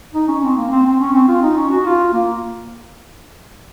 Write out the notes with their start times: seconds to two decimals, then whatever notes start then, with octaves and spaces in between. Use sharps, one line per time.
0.14 D#4
0.28 C#4
0.43 C4
0.57 A#3
0.72 C4
0.86 C4
1.00 C#4
1.13 C4
1.28 F4
1.42 D#4
1.57 C#4
1.71 F#4
1.86 F4
2.13 A#3